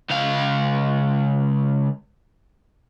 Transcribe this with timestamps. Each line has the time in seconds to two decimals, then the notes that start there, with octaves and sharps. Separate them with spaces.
0.10 C#2 F5